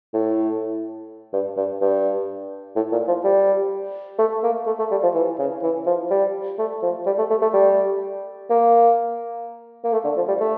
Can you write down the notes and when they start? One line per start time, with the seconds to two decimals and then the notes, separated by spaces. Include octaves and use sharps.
0.14 A2
1.33 G2
1.57 G2
1.81 G2
2.76 A2
2.92 A#2
3.07 F3
3.24 G3
4.19 A3
4.43 A#3
4.67 A3
4.79 A3
4.91 G3
5.03 F3
5.14 E3
5.39 C#3
5.63 E3
5.86 F3
6.10 G3
6.59 A3
6.82 F3
7.06 G3
7.18 A3
7.30 A3
7.42 A3
7.53 G3
8.50 A#3
9.84 A#3
9.93 A3
10.04 D3
10.16 F3
10.28 G3
10.40 A3